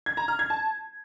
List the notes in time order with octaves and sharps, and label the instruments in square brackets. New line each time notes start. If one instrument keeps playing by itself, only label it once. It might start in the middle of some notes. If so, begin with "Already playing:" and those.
[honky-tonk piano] G#6
A#5
F6
G#6
A5